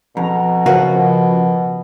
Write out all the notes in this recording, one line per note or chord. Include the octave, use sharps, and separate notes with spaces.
F2 B2 A#5
C#3 F3 F#4 A#4 B4 F5